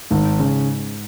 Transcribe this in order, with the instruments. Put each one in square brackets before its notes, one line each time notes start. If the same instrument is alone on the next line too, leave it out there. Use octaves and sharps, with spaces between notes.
[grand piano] G#1 [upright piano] G#2
[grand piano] C#3